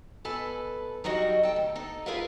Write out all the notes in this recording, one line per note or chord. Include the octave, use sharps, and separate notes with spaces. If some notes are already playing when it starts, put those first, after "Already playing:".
B2 A4 B4 G#5
F#3 G3 D#4 F#4 D#5
A4 G5
D2
D#4 A4
F4 G#4 A#4 B4 E5 F5